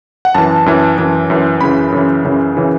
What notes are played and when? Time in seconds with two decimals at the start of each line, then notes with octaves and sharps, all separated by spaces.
0.25 F#5
0.35 F#2 E3 A5
0.66 F#2 E3
0.98 F#2 E3
1.30 F#2 E3
1.61 F#2 C#3 E3 B5
1.92 F#2 C#3 E3
2.25 F#2 C#3 E3
2.57 C#3 E3